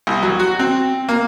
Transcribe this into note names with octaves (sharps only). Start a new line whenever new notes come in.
C2
F#3
F#4
C4
A#3